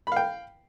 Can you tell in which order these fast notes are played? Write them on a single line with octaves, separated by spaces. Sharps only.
B5 F5 G5